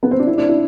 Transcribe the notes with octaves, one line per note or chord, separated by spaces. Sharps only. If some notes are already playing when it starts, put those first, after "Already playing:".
B3
C4
D4
E4
D4
E4